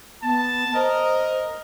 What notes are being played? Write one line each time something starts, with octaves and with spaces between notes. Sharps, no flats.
B3 A5
A#4 C5 D#5